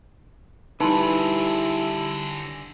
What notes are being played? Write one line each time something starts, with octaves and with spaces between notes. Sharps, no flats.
D3 G3 D#4 E4 G#4 B4 A5 C6